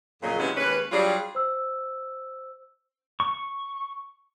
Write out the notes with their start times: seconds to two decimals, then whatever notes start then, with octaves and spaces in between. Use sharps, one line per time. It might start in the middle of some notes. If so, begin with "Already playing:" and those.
0.23 F2 A#2 C#3 F#3 G#4 D#5
0.39 C3 E3 F#3 G#3 C#4 E4
0.56 D#2 G#3 C#4 B4
0.92 F#3 G3 D4 F4 G4 G#4
1.35 C5 E6
3.20 C#6